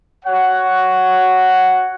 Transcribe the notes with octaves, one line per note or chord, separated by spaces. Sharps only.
F#4 C#5 F#5